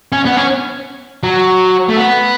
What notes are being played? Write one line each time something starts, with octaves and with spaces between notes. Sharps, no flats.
C#4
B3
C#4
F#3
A3
B3